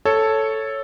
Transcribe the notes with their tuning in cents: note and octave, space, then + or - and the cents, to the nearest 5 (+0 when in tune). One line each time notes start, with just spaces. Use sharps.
A4 +0 C#5 +0